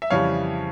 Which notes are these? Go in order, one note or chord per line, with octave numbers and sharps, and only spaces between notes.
E5
F2 C#3 E3 G3 C#5 F5